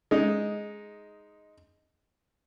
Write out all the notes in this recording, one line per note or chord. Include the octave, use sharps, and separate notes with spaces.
G#3 D#4